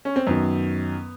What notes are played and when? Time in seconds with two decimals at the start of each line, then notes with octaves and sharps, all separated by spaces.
0.05 C#4
0.16 C4
0.27 F#2 D#3 F#3 B3